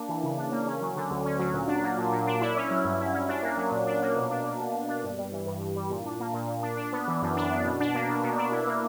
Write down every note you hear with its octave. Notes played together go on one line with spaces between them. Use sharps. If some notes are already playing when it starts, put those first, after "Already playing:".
Already playing: A#3 D4
E3
C#3
D4
A#3
C#4
F#3
D3
D2
C#4
F#3
A#2
D4
A#3
A#2
A#2
D4
E4
C#4
F#3
G2
E4
C#4
D4
A#3
F#3
A#2
D4
A#3
B2
D4
A#3
B2
B2
D4
G2
G3
E3
G2
G2
G3
A#2
D4
A#3
A#2
A#2
D4
D4
B3
E3
F#2
D4
B3
B2
D4
A#3
B2
B2
D4
E4
A#3